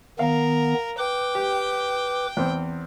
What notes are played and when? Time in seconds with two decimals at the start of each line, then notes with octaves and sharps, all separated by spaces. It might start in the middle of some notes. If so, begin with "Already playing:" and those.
0.19 D#3 B3 A#4 F5
0.98 B4 G5 D6
1.35 G4
2.37 E2 C4